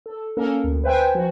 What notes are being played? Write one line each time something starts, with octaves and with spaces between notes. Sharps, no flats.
A4
A#3 C#4 A4 A#4
D2
B4 C5 E5 G5 G#5
F3 F#4